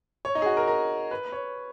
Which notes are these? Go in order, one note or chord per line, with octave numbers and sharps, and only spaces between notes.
C#5
D#4
G#4
F#4
A#4
A#4
B4
C#5